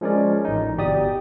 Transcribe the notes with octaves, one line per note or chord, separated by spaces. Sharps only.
F3 G#3 C#4 A#4 D5
A1 D#4
G1 B2 G4 D5 D#6